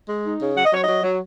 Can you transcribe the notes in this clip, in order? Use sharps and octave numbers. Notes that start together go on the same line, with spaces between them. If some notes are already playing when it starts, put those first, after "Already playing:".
G#3
D#4
C#3
F#3 F#5
D#5
F#3 C#5
F#3 D#5
F#3